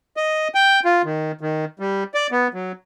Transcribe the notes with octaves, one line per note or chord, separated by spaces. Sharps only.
D#5
G5
F4
D#3
D#3
G3
D5
B3
F#3